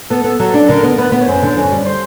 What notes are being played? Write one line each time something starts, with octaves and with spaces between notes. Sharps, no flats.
B3 A4
B3
F#3 A4
D4
D3 A#4
B3
B3 B4
B3
C#5
F#2 C5
D3
F#2
G3
C5